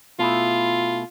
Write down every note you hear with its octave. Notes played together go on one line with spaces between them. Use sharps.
B2 A3 E4 F4